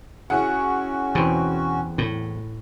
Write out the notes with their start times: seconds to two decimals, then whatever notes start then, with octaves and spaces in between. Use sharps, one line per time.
0.30 C#4 E4 F#4 G#4 F#5
1.15 E2 B2 C4
1.98 A2